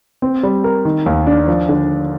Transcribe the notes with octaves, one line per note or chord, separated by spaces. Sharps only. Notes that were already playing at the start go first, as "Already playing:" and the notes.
C4
G3
A#4
D#3
D#2
D4
F3
D3